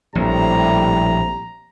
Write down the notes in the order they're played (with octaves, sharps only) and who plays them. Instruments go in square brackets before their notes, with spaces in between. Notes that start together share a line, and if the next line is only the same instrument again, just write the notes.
[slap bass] A#1 [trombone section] A2 C3 G3 [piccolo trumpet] A#5